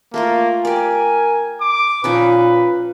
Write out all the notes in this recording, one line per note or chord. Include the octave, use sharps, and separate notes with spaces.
A3 A#3 F4 A#4
G4 A#4 D5 G#5
D6
A#2 F3 C#4 D#4 B4